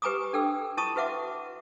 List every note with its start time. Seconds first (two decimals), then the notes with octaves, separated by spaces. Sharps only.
0.02 G4 B4 G#5 A#5 D6 D#6
0.33 D4 A4 G5 E6
0.77 E4 F4 A5 A#5 C#6 D#6
0.96 F#4 B4 E5 F#5 D6